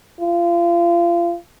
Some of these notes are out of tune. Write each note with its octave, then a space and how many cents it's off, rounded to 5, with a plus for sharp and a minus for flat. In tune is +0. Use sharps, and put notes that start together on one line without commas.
F4 -30